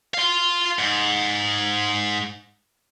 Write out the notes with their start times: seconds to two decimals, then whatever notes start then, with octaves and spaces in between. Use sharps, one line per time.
0.14 F5 C6
0.79 G#2